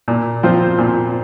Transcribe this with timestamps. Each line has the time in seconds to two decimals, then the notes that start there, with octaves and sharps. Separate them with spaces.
0.08 A#2
0.43 F3 C4 F4 C5
0.78 A#2